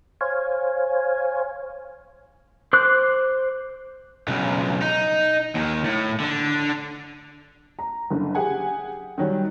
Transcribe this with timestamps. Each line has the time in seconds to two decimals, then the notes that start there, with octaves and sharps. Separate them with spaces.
0.21 C5 C#5 F5 G#5
2.73 C5 D6 F#6
4.28 B1 C#3
4.82 D#4
5.55 D#2 D#3
5.84 A2
6.20 D3 D4
7.79 A#5
8.10 F#1 D3
8.35 G4 G#4 F#5 G#5
9.18 D#3 F#3 G3